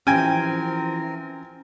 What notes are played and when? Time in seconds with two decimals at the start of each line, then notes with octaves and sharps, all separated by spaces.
0.07 E3 F3 C4 C#4 G4 A#4 G5 G#5